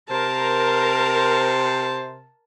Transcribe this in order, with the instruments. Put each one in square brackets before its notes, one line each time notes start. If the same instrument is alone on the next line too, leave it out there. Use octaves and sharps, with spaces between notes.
[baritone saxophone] C3 [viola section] A#4 [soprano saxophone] C5 [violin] A5